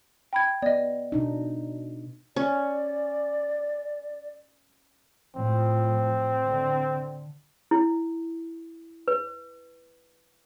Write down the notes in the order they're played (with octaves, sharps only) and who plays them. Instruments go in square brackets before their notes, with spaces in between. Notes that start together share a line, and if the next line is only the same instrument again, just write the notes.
[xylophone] G5 B5 G#6
[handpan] B3 [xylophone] D5 D#5
[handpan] B2 D4 D#4
[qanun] C#4 [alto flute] D5
[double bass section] A2 F3 [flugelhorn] C4
[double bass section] D3
[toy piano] E4
B4